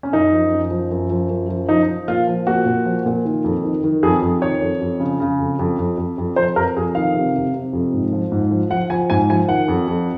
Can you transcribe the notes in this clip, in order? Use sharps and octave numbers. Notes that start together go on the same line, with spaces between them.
C#4
F#2 D#4
F3
F#2
F3
F#2
F3
F#2
F3
F3 D#4
F3
A#2 F4
F3
A#2 F#4
A#2
F3
A#2
D#3
F2
D#3
D#3
F2 G#4
F2
D#3 C#5
F2
F2
C#3
C#3
F2
F2
F2
F2
F2
F2 C5
F2 A#4
F2 G#4
D#3 F5
C3
C3
C3
F2
G#2
F3
G#2
F3
F3 F#5
F3 G#5
G#2 G#5
F3 G#5
D#3 F#5
F2
F2